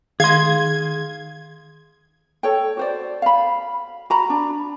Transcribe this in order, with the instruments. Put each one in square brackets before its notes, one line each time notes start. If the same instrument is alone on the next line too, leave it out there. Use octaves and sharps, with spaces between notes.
[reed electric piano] D#3 [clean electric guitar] G#4 C6 [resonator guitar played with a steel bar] F5 [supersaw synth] G#6
[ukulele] A4 C#5 G5
F#4 C5 D5
F5 B5
F#4 A#5 B5
D4